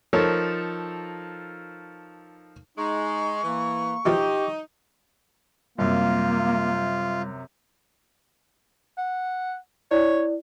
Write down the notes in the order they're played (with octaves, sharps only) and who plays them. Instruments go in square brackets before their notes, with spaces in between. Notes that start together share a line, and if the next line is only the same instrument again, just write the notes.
[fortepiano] F3 D#4 A4 A#4 C#5
[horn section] G#3 [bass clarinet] D#4 [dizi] C#6
[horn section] E3 [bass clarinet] A#3
[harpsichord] B2 E3 F3 [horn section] D#4 [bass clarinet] G4
[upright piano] F#2 C3 [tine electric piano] G3 [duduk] A#3 [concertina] F4
[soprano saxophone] F#5
[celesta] E4 D5 [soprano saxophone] C#5